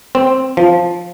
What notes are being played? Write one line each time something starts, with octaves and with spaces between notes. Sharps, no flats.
C4
F3